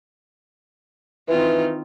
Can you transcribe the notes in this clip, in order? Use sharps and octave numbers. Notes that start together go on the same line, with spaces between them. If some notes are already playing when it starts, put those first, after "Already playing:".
D#3 E3 C4 F4